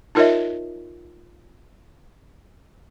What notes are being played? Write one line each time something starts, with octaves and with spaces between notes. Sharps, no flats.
D#4 F4 A#4 C#5 D#5 E5